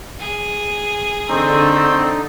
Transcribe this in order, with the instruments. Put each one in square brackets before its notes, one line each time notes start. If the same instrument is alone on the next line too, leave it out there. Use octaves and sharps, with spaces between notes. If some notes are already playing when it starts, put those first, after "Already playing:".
[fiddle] G#4
[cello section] D3 [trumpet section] A3 C4 [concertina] D#4